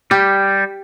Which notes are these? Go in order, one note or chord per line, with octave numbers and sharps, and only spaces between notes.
G3 G4